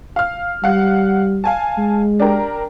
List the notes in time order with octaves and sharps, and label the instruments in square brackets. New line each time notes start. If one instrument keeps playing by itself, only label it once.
[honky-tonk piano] F5 F6
[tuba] G3 [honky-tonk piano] F5 F#5
[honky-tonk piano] F5 G#5 A5
[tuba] G#3
[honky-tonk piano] D4 G4 A#4